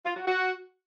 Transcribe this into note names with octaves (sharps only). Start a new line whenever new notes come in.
F4
F#4
F#4